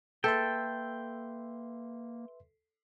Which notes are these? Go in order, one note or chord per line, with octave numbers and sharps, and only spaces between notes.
A#3 A4 B4 E5 G5 C6